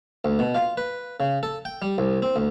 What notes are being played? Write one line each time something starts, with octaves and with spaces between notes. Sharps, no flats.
D2
B2
F4
B4
C#3
A4
G5
G3
C2
C4
D2